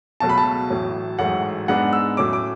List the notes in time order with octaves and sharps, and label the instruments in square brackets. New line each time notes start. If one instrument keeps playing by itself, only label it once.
[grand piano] C#2 B2 F#3 A3 A5
B5
A5
A1 A2 F#3
A1 G#2 F#3 A3 F#5
G#2 G#3 B3 D4 F#5
E6
A2 F#3 C#4 D6
D6